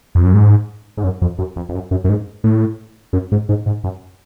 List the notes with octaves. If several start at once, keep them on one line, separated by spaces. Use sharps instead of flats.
F2
F#2
G#2
G#2
F#2
F2
F#2
F2
F2
F#2
F#2
F#2
G#2
A2
F#2
G#2
G#2
G#2
F#2